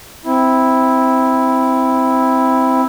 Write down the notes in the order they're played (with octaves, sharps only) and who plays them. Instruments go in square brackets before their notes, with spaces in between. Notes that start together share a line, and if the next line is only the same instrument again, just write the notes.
[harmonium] C4 E4